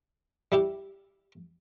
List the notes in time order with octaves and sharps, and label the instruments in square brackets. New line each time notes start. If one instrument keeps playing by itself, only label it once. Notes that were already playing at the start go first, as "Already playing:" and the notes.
[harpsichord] G3 E4 G4